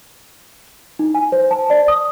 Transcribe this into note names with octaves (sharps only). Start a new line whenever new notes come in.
D#4
G#5
C5
A5
D5
D#6